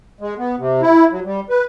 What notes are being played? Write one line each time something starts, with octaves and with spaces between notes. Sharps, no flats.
G#3
B3
C3
E4
F#3
G3
B4